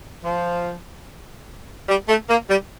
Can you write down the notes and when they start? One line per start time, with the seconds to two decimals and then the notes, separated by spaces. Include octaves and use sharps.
0.23 F3
1.88 G3
2.08 A3
2.29 A#3
2.49 G3